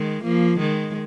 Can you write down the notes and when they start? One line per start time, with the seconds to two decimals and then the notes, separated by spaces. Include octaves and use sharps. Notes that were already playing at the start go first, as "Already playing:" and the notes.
Already playing: D#3 G#3
0.23 F3 A#3
0.59 D#3 G#3